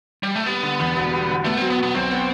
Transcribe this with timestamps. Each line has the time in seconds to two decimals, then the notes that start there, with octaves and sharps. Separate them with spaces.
0.23 G3
0.35 A3
0.46 G3 B3
0.63 D3
0.80 E2
0.96 E1
1.12 G3
1.29 D3
1.44 A3 B3
1.57 F#3 C4
1.70 B3
1.78 B2
1.83 B3
1.95 B1 C4
2.11 B3